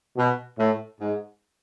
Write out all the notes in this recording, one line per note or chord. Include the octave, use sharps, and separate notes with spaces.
B2
A2
G#2